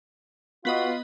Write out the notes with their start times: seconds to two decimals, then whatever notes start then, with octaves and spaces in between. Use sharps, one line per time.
0.65 B3 F4 F#4 B4 D#5